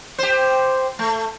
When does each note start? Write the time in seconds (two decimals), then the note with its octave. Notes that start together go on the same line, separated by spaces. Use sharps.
0.18 G4 C5
0.99 A3